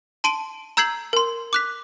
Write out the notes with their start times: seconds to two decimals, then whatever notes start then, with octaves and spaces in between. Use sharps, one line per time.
0.24 A5 C6 D7 D#7
0.77 A#5 E6 G6 G#6 C7 F#7
1.13 A#4 C6
1.53 D6 F#6 B6